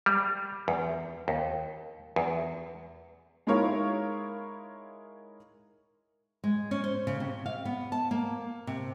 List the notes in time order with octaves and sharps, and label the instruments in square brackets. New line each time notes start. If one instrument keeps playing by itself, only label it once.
[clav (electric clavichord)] G3
E2
D#2
E2
[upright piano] G#3 D#4 E4 A#4 C#5 F5
[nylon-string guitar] G#3
C#4
C5
C#3
C3
F5
B3
A5
A#3
C3